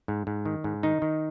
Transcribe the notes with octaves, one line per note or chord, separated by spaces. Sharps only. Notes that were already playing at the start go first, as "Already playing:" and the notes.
G#2
G#2
D#3
G#2
D#3 D#4
D#3